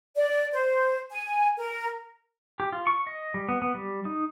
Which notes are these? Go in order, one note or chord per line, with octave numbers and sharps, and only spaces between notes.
D5
C5
G#5
A#4
G4
F4
C#6
D#5
G3
B3
B3
G3
D#4